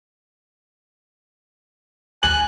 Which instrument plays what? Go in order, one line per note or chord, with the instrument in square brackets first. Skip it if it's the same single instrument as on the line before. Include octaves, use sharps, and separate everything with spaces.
[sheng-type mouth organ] G#5 F#6 [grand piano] F#7